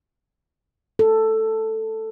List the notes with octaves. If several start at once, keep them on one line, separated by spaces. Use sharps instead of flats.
A4